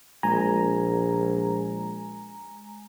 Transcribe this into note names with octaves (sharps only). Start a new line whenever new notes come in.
A#1 G#3 G#5 A#5